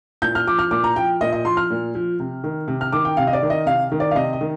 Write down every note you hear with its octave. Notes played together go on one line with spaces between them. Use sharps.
A#2 G6
F6
F3 D6
F6
A#2 D6
A#5
F3 G5
A#2 D#5
D#5
F3 C6
F6
A#2
F3
C3
D#3
C3
F6
D#3 D6
G5
C3 F5
D#5
D5
D#3
D#5
C3 F5
D#3
D5
F5
C3 D#5
D#5
D#3